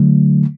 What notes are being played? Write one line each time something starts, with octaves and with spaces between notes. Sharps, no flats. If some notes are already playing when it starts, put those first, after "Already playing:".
Already playing: D3 F#3 A3